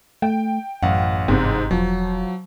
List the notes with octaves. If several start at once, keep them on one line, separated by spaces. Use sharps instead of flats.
A3 G5
A1 F#2 F5 F#5
G1 G#2 C3
E1 F3 F#3